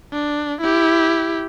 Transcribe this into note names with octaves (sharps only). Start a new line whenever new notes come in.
D4
E4 G4